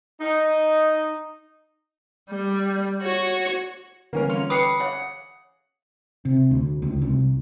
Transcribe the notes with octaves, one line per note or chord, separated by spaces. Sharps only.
D#4
G3
F#4 C#5
D3 E3 G3 A#3 C#4 A#4
C#4 F4 F6 C#7 F7
G4 B4 D6 D#6 C7 C#7
C#3 C#5 F#5
C3
D2
C#2
C2